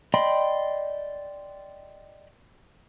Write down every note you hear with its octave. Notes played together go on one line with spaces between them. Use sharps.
D5 D#5 G5 B5 C6